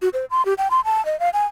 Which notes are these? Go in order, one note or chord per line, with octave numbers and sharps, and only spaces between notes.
F#4
C5
C6
G4
G5
C6
A5
D#5
F5
G#5